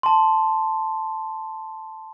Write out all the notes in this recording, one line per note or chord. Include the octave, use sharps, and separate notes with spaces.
A5 C6